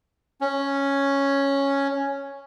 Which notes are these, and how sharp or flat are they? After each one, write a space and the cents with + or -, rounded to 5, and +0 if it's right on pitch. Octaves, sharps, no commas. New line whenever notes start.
C#4 +0 C#5 +0